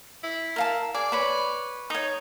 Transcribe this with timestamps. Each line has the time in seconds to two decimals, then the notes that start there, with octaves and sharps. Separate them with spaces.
0.23 E4
0.56 A#4 F5 A5
0.94 G#4 D5
1.12 B4 C#5 B5
1.90 D#4 C#5 D#6